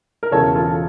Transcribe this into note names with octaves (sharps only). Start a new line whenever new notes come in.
A#4
E1 E2 C#3 E3 A4 C#5
A#4
F4 A4
A4